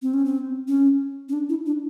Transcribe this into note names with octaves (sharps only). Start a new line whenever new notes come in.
C4
C#4
C4
C#4
C#4
D4
E4
D4